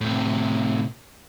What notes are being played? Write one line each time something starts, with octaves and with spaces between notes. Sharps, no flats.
A2 C3